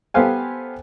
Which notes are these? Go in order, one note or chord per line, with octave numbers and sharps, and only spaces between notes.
B3 G4 A4 C5 F5 G#5